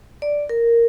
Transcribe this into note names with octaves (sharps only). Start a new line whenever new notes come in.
D5
A#4